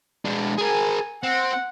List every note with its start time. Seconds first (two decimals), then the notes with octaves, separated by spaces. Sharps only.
0.25 G#3 D4
0.58 G#4 A#4 G#5
1.23 C4 F#5